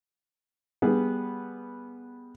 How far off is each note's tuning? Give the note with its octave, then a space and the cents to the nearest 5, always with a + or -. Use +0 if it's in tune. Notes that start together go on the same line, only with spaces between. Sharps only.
G3 +0 B3 -10 G#4 +0